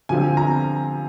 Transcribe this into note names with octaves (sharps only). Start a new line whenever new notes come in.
D3 F3 C4 G#5
A#5